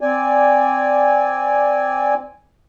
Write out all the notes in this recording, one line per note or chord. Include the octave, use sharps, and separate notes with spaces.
C4 D5 G#5